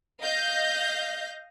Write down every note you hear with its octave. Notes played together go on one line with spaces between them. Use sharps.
D#5 F5 G6 A#6